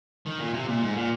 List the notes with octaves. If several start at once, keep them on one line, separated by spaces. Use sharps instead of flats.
D#3
A#2
C3
A#2
G#2
A#2